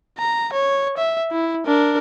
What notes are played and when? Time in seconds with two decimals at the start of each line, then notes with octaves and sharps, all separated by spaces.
0.18 A#5
0.53 C#5
0.97 E5
1.32 E4
1.66 D4 A#4